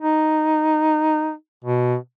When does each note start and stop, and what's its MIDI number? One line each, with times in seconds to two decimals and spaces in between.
0.01 1.33 63
1.64 1.96 47